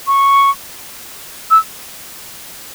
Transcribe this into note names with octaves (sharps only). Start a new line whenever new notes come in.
C#6
E6